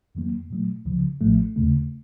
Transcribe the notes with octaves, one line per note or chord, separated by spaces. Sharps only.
F2 D#3 F#3 A#3
A#2 F#3 A3
C#2 C#3 F3
A1 A2 F3 A3
D#2 C#3 A3